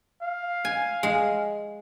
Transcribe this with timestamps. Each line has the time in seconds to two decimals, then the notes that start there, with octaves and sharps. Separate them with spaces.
0.22 F5
0.65 G#5
1.03 G#3